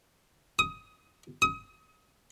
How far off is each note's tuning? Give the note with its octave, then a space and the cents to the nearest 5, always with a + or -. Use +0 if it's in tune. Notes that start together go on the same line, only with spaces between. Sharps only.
D#6 +15
D#6 +30